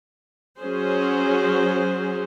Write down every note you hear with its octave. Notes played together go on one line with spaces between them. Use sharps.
F#3 C#4 G#4 C5